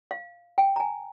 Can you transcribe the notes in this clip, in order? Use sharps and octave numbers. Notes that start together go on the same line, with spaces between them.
F5
G5
A#5
G#5